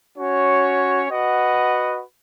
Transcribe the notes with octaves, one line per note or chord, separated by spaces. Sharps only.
C#4 F#4 C#5
F#4 B4 D#5 F#5